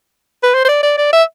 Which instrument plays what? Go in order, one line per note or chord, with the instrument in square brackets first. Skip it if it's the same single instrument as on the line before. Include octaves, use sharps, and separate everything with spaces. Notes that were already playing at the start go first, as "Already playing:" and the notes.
[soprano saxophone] B4
C5
C5
D5
D5
D5
E5